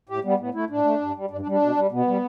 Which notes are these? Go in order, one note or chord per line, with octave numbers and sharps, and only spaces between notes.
A2 G4
G3 B3
A2 B3
A3 E4
A2 D4
A3
G2
G3
G2 D4
D4
G3
D4
B2
G3
B2 B3
G3